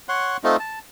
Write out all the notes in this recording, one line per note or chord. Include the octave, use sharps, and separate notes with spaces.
C#5 F#5 C6
A3 C4 D#4 F4
A5